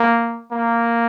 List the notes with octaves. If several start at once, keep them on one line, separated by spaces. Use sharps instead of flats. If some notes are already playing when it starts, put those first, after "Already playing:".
Already playing: A#3
A#3